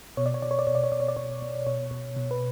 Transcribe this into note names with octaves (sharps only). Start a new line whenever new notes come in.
B2 C#5
D5
C#5
B2 D5
C#5
D5
B2 C#5
D5
C#5
B2 D5
C#5
D5
B2 C#5
B2
B2 C#5
B2
B2
B4